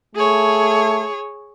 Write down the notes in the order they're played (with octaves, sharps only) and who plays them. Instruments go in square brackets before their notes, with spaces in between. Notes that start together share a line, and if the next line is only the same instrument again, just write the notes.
[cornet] A3 [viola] G#4 C#5